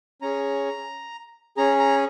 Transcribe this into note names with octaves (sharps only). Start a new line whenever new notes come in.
C#4 G#4 A#5
C#4 G#4 A#5
A#5